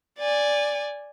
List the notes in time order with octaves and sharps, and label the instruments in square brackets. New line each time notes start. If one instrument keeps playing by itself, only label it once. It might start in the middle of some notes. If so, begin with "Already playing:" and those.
[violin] D5 G#5